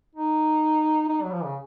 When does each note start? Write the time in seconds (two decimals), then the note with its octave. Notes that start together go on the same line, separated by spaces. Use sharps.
0.16 D#4
1.09 D#4
1.23 F#3
1.32 F3
1.45 C#3